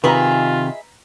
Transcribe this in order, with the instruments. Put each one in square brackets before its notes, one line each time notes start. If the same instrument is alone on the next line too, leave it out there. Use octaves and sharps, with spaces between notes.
[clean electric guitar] C3 D#3 [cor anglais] F4 [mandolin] G#4 D#5 E5 [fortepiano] B4 A#5